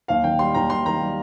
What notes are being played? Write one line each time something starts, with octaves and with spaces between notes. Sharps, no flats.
D#2 F5
D#3 G5
G3 C6
D#2 A#5
D#2 C6
D#3 A#5
G3